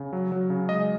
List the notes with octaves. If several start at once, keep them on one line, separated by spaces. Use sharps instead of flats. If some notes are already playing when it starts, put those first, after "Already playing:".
Already playing: C#3
F#3
F#3
C#3
G#3 D#5